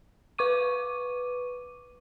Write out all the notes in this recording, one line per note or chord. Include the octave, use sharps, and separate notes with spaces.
B4 C#6 D6 D#7